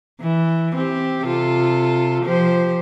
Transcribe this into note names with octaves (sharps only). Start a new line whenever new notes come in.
E3
C4 G4
C3 F4 A4
F3 G4 C5